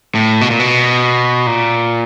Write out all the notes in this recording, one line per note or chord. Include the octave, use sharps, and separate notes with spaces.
A2
B2
A#2
B2
A#2